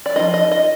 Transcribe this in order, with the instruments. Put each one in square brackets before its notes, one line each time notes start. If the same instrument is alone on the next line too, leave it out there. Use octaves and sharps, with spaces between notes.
[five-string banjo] D5
F3 A#3 D#4 D#5
D#5
D#5